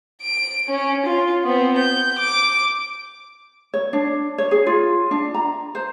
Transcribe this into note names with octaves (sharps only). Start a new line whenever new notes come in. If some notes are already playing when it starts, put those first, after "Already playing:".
D7
C#4
F4
B3 C4
G6
D6
C#5
D4
C#5
G#4
F4
D4
A#5
C5